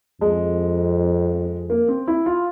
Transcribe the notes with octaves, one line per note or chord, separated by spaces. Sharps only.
F2 G#3
A#3
C4
E4
F4